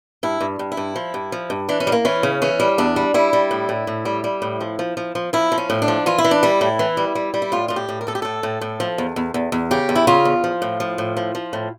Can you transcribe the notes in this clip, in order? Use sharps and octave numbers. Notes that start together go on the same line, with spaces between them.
G2 E4
G2
G2
E4
G2
F3
G2
F3
G2
E3 D4
C#4
G3
A#3
E3 C#4
C#3
E3 C#4
G3
E2 D4
G3
G3 E4
G3
A2
A2
A2
G3
G3
A2
F3
F3
F3
F3
F3 E4
F3
C#4
A2
D4
F3
E3 F4
E4
E3
D4
G3 E4
A2
E3
G3
G3
G3
E4
A2 F4
A2 F4
G4
A2
A#4
A2 A4
G4
A2 A4
A2
A2
F3
E2
E2
E2
E2
C#3 G4
E2
E4
C#3 F4
E2
F3
A2
F3
A2
F3
F3
A2